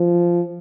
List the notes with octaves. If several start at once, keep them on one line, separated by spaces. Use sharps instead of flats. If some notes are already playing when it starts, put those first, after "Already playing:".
Already playing: F3